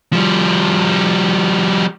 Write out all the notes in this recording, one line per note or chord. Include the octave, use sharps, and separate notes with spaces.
F3 G3